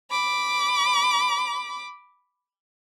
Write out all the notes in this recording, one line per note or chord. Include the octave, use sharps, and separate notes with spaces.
B5 D6